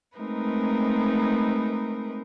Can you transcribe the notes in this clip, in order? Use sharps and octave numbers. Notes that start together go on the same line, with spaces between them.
G#3 A3 C4 D#4 A#4 B4